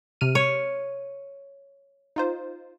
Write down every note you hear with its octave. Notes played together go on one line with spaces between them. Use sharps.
C3 F6 D#7
C#5
D#4 F4 C5